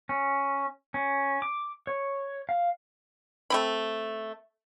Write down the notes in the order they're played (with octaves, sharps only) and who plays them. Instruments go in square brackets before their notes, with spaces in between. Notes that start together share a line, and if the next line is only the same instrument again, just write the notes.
[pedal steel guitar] C#4
C#4
D6
C#5
F5
[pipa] A3 C4 B5